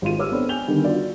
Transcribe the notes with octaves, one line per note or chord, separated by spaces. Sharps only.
G#1 G#3 F4 D#7
G4 C#5 D6 E6 F6
B3 C4 D4 A4 C5
G5 G#5 G6 F7 G7
D3 D#3 G3 B3
F4 F#4 D5